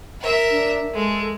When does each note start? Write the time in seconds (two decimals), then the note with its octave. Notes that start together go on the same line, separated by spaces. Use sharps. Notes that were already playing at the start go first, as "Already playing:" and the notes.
0.20 A#4 E5
0.50 D4
0.94 G#3 A4